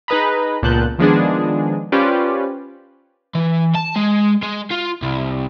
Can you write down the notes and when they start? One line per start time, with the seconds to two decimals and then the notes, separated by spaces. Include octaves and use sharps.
0.08 D#4 G#4 B4 D#5 A#5 B5
0.63 C#2 A#2 B3 A5 F#6 G6
0.98 D#3 F3 G#3 B3 D4 G#4
1.92 C#4 F4 G4 B4 C5 D5
3.35 E3
3.75 A5
3.96 G#3
4.43 G#3
4.71 F4
5.03 C2